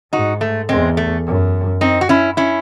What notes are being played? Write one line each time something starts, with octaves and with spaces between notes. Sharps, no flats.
G#2 D#4 F#4
A3
E2 G#3 C4
A3
F#2
C4 D#4
F#4
C#4 E4
C#4 E4